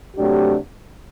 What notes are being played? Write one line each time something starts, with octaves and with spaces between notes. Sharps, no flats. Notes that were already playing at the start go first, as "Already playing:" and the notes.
C3 F#3 A3 D4 G4